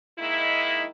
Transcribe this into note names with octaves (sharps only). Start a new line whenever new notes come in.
D#3 G#3 A#3 D#4 E4